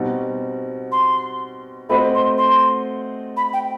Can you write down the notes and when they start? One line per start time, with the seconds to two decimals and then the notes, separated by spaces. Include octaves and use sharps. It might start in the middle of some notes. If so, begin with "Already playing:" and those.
Already playing: B2 G3 C4 D#4 F#4
0.92 C6
1.89 A3 C4 F#4 C5 D#5 B5
2.14 C6
2.38 C6
3.36 B5
3.53 G5